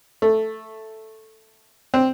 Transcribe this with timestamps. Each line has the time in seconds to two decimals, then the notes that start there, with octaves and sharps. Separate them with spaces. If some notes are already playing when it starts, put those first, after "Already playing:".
0.22 A3
1.94 C4